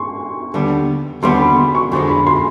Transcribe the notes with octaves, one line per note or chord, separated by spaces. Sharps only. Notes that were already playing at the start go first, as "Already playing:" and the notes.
Already playing: C6 C#6
D#2 D3 G3 B3
D#2 D3 G3 B3 C6
B5
C6
C#6
F2 D3 F3 G#3 C6
B5
C6